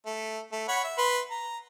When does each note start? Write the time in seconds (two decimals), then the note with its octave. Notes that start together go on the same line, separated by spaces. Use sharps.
0.06 A3
0.52 A3
0.68 C#5 F#5 B5
0.84 E5
0.98 B4 C6
1.31 A#5